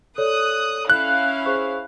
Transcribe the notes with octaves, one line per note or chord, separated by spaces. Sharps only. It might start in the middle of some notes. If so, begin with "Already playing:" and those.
A4 C#5 D5 D#6 F#6
C#4 E4 F5 F#6
G#4 C5 C#6